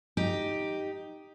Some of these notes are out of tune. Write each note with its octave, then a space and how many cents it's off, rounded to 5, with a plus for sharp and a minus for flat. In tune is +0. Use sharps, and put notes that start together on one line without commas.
D#4 +0 G4 +0